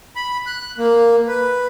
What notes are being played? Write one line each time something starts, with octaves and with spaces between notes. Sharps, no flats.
B5
F#6
A#3
B4